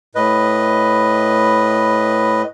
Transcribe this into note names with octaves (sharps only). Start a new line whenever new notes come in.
A2 B4 D#5